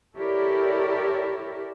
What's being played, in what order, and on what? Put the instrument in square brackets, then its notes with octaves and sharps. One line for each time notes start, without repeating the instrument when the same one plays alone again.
[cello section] E4 G4 A4 A#4 C#5 D5